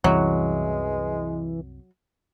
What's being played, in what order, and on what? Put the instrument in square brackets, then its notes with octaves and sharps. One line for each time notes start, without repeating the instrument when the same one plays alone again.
[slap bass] C2 F#2 [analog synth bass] E3 [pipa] F#3 [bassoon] G#3